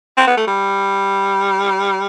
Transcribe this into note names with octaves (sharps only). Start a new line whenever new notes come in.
C4
B3
A3
G3